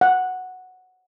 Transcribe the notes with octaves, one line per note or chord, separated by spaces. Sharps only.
F#5